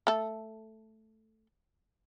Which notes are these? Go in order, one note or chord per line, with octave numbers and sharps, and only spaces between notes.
A3 A4